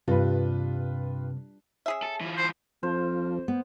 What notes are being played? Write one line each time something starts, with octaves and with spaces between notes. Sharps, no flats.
G2 C3 F4 B4
C#4 G#4 E5
A4
E3 F4
C5
F2 F3 C5
B3